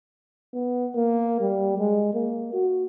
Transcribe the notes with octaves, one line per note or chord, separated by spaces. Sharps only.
B3
A#3
G3
G#3
A#3
F#4